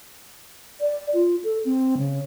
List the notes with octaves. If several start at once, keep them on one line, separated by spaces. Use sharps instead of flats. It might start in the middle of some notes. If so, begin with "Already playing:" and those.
D5
F4
A4
C4
C#3